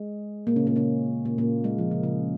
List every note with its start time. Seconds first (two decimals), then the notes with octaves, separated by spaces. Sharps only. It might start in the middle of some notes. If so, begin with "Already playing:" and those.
Already playing: G#3
0.47 A#2 A#3
0.56 C#3 C#4
0.67 A#2 A#3
0.76 C#3 C#4
1.25 A#2 A#3
1.38 A#2 A#3
1.64 G#3
1.78 F3
1.91 C#3
2.03 C#3